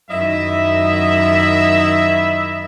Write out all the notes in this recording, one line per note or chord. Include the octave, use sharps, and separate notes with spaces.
F#2 D#3 E4 D#5 E5